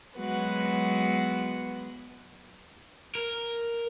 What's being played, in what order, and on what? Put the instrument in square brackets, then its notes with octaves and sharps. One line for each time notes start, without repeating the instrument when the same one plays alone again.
[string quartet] F#3 G#3 B3 F#4 B4
[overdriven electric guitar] A#4